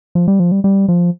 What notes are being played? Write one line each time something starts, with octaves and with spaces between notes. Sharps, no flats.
F3
G3
F3
G3
G3
F3